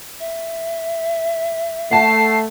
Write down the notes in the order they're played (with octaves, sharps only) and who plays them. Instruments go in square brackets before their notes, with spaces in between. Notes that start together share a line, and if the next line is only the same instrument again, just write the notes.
[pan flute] E5
[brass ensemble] A3 [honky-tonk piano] F#5 A5 [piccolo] C7